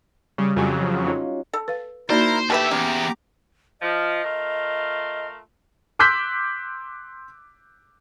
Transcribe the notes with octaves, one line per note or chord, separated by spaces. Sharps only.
C#3 G3
F2 C#3 F#3 F#4 G4 G#5
C#4 D#4 F4
A4
B4 F5
A#3 D#4 E4 F#4 A#4 C5 D5 A#5
D2 A3 G4 B4 E5 A5
E2 C#4 G4 A#5 D6
F3 D#5
A3 F4 A#4
C6 D6 E6 F#6 G6 B6